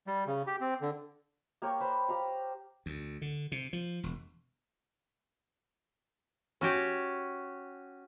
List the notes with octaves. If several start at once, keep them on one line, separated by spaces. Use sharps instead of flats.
G3
C#3
G4
C4
D3
A#3 G4 A#4 C#5
B4 C5 B5
G4 F5 A#5
D2
D3
C3
F3
E1
C#4 F#4 G4